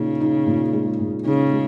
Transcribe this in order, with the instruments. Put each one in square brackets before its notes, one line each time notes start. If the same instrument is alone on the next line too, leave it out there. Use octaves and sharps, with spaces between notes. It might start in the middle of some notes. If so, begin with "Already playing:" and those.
Already playing: [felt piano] A#2 D#4 [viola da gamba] C#3
[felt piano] D#4
A#2
G#3
A#2
[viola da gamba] C#3 [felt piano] D#4
[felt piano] G#3